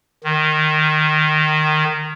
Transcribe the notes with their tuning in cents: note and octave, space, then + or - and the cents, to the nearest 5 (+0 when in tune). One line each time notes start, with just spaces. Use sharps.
D#3 -15